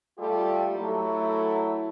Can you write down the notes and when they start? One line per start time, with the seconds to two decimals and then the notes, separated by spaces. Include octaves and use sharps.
0.19 G3 A3 F4 G4 A4
0.75 F#3 A3 E4